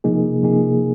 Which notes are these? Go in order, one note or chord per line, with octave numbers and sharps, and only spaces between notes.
C3 F3 A#3 D#4 G#4
C3 F3 A#3 D#4 G#4